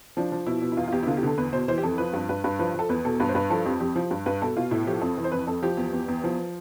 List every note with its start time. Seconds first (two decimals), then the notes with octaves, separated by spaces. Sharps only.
0.17 F3 D4
0.32 F3
0.46 B2 E4
0.62 B2
0.72 E4
0.77 E2 F4
0.88 F4
0.92 E2 G4
1.03 E4
1.07 D3 F4
1.17 G4
1.23 D3 A4
1.38 E2 B4
1.53 B2 C5
1.68 E3 C5
1.78 G4
1.83 F2 A4
1.98 F3 B4
2.13 G2
2.29 G2 B4
2.44 G2 B4
2.59 F3 B4
2.74 F3 A4
2.89 E2 B4
3.05 B2 A4
3.20 G2 B4
3.29 C5
3.35 G2 B4
3.50 F3 A4
3.65 F2 G4
3.80 F2 G4
3.96 F3
4.11 G2
4.26 G2 B4
4.42 B2 A4
4.57 B2 F4
4.71 A2 E4
4.87 F3 G4
5.01 F2 A4
5.17 E3
5.24 C5
5.32 F2 B4
5.47 F2 A4
5.62 F3 G4
5.77 E2
5.93 E2
6.08 E2
6.24 F3